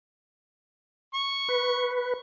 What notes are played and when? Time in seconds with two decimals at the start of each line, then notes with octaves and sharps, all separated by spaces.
1.14 C#6
1.49 B4